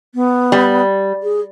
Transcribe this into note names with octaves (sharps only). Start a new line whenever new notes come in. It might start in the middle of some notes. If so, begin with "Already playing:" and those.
B3
G3
G#4